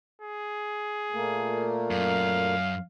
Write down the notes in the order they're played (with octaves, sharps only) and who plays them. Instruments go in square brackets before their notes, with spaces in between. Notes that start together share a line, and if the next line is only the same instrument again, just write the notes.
[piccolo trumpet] G#4
[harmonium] A#2 A3 A#3
[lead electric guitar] F#2 [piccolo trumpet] F5